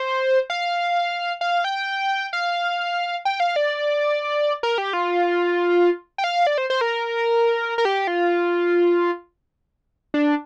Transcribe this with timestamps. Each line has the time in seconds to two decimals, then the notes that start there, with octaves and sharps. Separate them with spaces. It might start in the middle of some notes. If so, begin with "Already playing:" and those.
Already playing: C5
0.50 F5
1.41 F5
1.64 G5
2.33 F5
3.25 G5
3.40 F5
3.56 D5
4.63 A#4
4.78 G4
4.93 F4
6.18 G5
6.24 F5
6.47 D5
6.58 C5
6.70 C5
6.81 A#4
7.78 A#4
7.85 G4
8.07 F4
10.14 D4